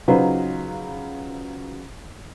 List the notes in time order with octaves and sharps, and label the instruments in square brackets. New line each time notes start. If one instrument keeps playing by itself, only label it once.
[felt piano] C#3 F#3 D#4 F4 B4 C5